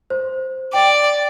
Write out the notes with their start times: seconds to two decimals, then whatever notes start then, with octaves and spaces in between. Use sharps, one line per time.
0.10 C5
0.73 D5 G5